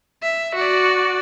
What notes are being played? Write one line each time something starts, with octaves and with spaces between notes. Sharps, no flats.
E5
F#4 D5